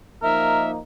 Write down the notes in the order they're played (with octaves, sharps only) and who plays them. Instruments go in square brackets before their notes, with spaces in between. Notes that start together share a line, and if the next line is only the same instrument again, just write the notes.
[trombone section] F3 A#3 D#4 [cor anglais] A#4 [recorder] E5